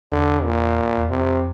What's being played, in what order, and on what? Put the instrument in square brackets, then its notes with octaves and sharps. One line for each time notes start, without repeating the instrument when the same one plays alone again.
[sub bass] E2 [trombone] D3
[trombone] A#2
[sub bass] E2
[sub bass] F2 [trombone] C3